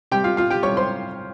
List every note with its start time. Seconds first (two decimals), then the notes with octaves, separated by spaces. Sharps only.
0.11 C3 G3 G4 G5
0.24 F4 F5
0.37 F4 F5
0.51 G4 G5
0.63 C3 G3 C#5 C#6
0.77 C5 C6